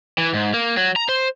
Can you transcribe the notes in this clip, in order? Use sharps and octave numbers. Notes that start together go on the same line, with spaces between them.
E3
G#2
A#3
F#3
A#5
C5